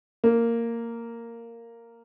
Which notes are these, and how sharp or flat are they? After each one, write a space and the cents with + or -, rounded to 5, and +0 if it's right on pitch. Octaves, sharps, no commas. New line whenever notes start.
A#3 -10